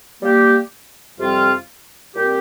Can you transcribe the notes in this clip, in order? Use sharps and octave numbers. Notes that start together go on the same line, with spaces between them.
G3 A#3 G4
F2 C3 G3 C4 F4
A#2 G3 C4 G4